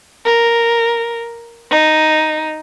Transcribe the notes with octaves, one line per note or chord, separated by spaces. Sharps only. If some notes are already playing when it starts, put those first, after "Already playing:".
A#4
D#4